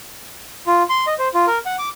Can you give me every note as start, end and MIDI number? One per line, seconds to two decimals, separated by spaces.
0.67 0.83 65
0.89 1.05 84
1.07 1.14 75
1.19 1.28 72
1.34 1.46 65
1.47 1.58 70
1.66 1.76 78
1.79 1.89 86